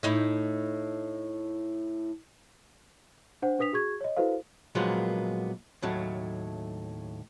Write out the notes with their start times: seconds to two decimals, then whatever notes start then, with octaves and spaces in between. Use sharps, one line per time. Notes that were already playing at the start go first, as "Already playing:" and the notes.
0.03 A2 D#4 E4
3.42 D4 C5 F#5
3.59 D4 B4 D#6 B6 F7
3.73 F#4 G#4 C#6 G#6
4.01 C#5 D#5
4.17 E4 F#4 A4 B4 C5 F5
4.75 A#2 F3 F#3 G#3 A#3 B3
5.82 D#2 A2 F#3 A3